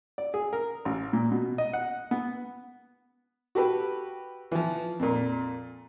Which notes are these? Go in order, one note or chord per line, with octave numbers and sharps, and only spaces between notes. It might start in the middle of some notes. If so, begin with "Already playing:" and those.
D5
G#4
A#4
A1
A#2
B2
D#5
F#5
B3
F#4 G4 A4 B4
E3 F3
F2 A#2